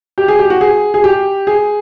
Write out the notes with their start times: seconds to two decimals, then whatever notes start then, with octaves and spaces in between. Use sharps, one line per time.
0.18 G4
0.28 G#4
0.39 G4
0.50 F#4
0.61 G#4
0.94 G#4
1.04 G4
1.47 G#4